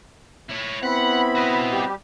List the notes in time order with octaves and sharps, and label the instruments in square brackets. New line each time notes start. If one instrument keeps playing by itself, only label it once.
[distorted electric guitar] E4 C#5
[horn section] B3 C4 E4 [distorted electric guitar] F#5 [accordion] B5
[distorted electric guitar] F#4 D#5
[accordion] G3 G4